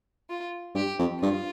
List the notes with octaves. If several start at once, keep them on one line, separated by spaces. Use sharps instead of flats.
F4
G2 G4
F2
G2 F4